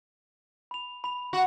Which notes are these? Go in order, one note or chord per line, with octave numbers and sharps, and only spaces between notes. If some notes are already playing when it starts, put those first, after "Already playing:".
B5 F7
B5 F7
F#4